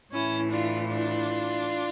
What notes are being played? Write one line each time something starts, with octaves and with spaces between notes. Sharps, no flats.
A2 E3 C#4 E4
D4 F4
D4 F4